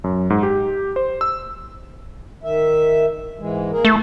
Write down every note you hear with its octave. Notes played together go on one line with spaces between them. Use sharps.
F#2
G#2
G4
C5
E6
D#3 E5
G#2 E3 G#3
A#3 G#4 A#4
A3 E4